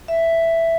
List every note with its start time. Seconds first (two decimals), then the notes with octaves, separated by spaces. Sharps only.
0.08 E5